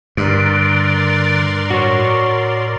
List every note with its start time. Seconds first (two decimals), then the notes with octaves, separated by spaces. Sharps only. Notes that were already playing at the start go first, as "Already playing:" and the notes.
0.17 G2 D3 A#4 D5 C6
1.70 A2 F#4 C#5